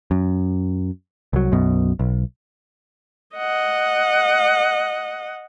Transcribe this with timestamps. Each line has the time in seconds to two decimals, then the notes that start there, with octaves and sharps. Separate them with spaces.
0.11 F#2
1.33 C2 F#3
1.52 B1 F#2 B2
1.99 B1
3.36 D#5 F#5